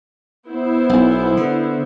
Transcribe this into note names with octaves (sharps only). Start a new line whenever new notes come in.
B3 E4 C5
B1
D3